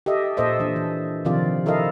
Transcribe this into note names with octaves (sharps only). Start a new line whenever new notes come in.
G4 A4 D#5 E5
A#2 A4 C5 D#5 E5
E3 D4
E3
C3 D#3 F3 C4 F4 D5
E4 A4 A#4 D#5 F5